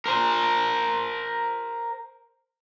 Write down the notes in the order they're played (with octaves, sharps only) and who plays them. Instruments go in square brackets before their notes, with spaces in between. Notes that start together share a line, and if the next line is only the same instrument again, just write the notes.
[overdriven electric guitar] A#4 C5